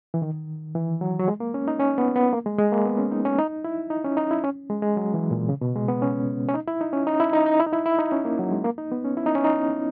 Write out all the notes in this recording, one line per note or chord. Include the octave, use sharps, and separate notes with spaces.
E3
D#3
E3
F#3
F#3
G#3
A#3
C#4
D#4
C#4
B3
B3
A#3
G#3
G#3
A#3
B3
C#4
D#4
C#4
D#4
E4
D#4
C#4
D#4
E4
C#4
G#3
G#3
F#3
E3
A#2
C#3
B2
G#3
B3
C#4
C#4
D#4
E4
D#4
C#4
D#4
E4
D#4
D#4
E4
D#4
E4
E4
D#4
C#4
A#3
F#3
G#3
A#3
D#4
B3
C#4
E4
D#4
C#4
D#4